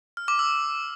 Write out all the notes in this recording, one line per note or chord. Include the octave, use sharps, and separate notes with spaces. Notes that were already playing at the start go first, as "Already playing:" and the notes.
F6
D6
E6